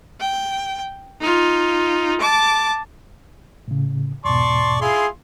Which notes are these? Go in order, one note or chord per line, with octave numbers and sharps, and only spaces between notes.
G5
D#4 F4
A5 D6
A2 C#3
E2 G#2 B2 D5 A5 C6 C#6
E4 F4 G#4 C6